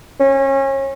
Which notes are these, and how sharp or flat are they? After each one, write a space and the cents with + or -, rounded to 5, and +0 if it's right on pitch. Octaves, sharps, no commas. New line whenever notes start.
C#4 -30